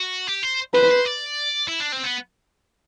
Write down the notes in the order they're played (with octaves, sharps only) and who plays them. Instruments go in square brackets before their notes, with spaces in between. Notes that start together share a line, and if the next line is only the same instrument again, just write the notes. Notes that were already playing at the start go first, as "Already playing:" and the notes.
Already playing: [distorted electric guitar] F#4
G4
C5
[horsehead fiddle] B4 [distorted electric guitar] C5
[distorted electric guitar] C5
D5
E4
D4
C4
B3